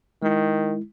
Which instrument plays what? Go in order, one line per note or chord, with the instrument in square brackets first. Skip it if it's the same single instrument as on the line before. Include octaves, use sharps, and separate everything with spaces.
[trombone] D#3 [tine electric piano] G#3 E4